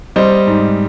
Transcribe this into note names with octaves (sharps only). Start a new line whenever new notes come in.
G3 C5 D#5
G#2